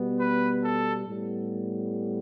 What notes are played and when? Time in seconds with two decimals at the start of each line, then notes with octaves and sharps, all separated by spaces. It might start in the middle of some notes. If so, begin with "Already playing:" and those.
Already playing: B2 G3 B3
0.20 B4
0.63 A4
1.06 A2 G3 B3